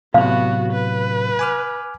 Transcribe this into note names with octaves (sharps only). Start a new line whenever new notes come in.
A2 C3 F#3 B3 F#4 F5
B4
G#5 D6 F6